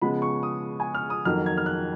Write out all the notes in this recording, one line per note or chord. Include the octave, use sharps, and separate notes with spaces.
C#3 F3 G#3 B3 B5
C#6
D#6
G#5
F6
D#6
F2 D#3 F#3 A#3 F6
G#6
F6
F#6